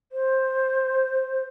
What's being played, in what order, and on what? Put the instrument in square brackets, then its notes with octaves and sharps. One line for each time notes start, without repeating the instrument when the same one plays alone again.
[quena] C5